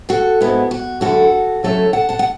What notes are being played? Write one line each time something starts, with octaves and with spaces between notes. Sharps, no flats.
F#4 A4
G#2 G#3 B3 E4
F#4
F#2 D3 A3 C#4 E4 F#4 A4
C#3 F#3 A3 C#4 E4 A4 C#5
F#5 A5
F#5 A5
F#5